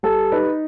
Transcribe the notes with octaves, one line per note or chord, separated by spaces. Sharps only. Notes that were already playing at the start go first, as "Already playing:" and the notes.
G3 A4
D#4 B4